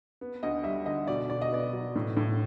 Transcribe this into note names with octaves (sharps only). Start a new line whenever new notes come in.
B3
D2 D#5
G3 E5
D3 D#5
B2 D5
B2 D5
D#5
B3 D5
F#3
A2
A2